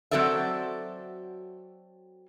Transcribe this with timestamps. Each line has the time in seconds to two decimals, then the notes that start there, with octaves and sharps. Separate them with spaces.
0.11 F#3 C4 F#4 A4 D5 E5